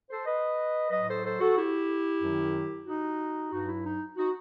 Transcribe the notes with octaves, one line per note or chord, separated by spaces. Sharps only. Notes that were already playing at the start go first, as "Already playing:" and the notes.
A4 C5
B4 D#5
A2 F#3 B4 D#5
A4 C5
A4 C5
F#4 A4
E4 G4
F#2 D#3 F#3
D#4 F#4
G2 F#3 D#4 F#4
E4
D#4
D#4 F#4